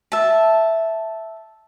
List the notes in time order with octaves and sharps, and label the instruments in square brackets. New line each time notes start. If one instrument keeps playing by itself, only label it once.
[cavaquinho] E5 A5